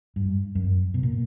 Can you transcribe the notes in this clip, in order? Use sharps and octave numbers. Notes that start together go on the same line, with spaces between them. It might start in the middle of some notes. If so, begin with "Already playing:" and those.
G2
F#2
B2
A#2